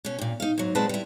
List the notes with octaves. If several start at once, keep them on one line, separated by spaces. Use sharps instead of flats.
B2 C#4
G2 A#2
D#4 F5
G#2 F#3
A#2 G#3 C4 B4 F#5 A5
G3 E4